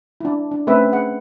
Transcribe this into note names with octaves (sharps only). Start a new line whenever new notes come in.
D4 E4
D4
A3 C4 C#4 B4 E5
G#4 F#5